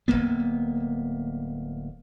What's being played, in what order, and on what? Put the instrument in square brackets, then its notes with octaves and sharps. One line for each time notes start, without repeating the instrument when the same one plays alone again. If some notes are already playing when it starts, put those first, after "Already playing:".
[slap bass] D1 G#1 A#3 B3